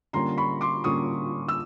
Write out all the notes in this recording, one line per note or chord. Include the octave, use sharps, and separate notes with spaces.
D3 G3 A#3 C#4 F4 A#5 C6
B5 C#6
C6 D6
D3 G3 A#3 C#4 F4 C#6 D#6
E6